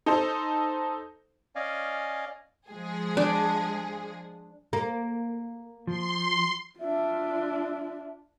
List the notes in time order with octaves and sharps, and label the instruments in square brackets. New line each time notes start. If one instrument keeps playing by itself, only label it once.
[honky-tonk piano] D#4 A4 C5
[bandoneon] C#4 D5 D#5 F5 G#5
[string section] F3 G#3 G#4
[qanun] D4
[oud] A#3
[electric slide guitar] F3 [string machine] C6
[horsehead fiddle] D4 F4 [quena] E5